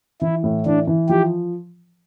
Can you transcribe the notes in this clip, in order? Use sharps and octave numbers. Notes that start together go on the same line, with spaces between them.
E3 E4
A2
E3 D4
E3
F3 G4